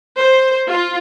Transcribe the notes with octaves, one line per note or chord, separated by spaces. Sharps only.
C5
F4